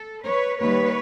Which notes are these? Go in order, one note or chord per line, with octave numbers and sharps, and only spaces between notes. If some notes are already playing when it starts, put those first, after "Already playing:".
Already playing: A4
B4 C#5
D#2 D#3 G3 B4 C#5